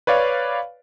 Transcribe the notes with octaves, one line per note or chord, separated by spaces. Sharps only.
B4 C#5 D5 F5